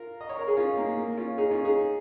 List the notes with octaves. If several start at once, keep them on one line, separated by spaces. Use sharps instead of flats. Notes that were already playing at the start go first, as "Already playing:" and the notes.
Already playing: F4 A#4
D#5
C#5
A#4
G#4
C#4 F4
A#3 D#4
A#3
C#4 F4
D#4 G#4
C#4 F4
D#4 G#4